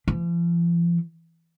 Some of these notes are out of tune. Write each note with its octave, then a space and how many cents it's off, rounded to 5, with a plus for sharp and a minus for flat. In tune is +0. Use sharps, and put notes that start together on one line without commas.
F3 -45